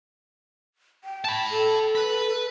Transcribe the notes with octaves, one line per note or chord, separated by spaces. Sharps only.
G5
A5 B5
A4
B4 B5